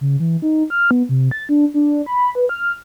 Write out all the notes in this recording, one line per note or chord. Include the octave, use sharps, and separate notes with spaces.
C#3
E3
D#4
F6
B3
C3
A6
D4
D4
B5
B4
F6